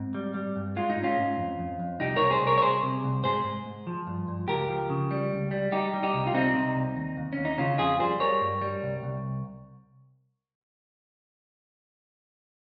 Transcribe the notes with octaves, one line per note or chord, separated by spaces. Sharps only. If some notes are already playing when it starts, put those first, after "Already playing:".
Already playing: G#2 C4
G3
G3
G2
G#3 F4
D#4
G#2
C#4 F4
G#2
F2
F2
F2
C2 D#4 G4
C2 A#4 C#5
G#4 C5
C2
A#4 C#5
C#5
C2 G#4 C5
C3
C2
G#2 G#4 C5
G#2
G#2
F3
G2
G2
C#2 G4 A#4
F3
C#3
G3
C#2
G3
G3 D#4 G4
G3
D#4 G4
C2
F4
C2 C4 D#4
C3
C2
D#2
D#2
C#4
D#2
D#4
C#3 C#4 F4
F2 F4 G#4
G3 G#4 C5
G3 A#4 C#5
G2
G3
C2
C2